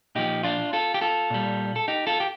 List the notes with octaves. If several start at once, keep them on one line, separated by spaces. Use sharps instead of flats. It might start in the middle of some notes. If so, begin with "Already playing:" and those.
A#2 F3 D#4 G4
D4 F4
F4 A4
G4
F4 A4
A#2 G3
A4
D#4 G4
F4 A4
G4